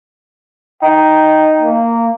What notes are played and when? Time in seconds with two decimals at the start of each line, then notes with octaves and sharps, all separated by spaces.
0.82 D#4 G5
1.61 A#3